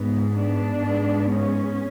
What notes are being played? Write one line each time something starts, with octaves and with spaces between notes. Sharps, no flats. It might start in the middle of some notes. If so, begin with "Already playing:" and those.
Already playing: G#2 G#3 B3
B3 D4
G#2 G#3 B3
C#4